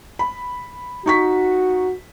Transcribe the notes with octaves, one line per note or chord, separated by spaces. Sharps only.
B5
D#4 F#4 C#6 B6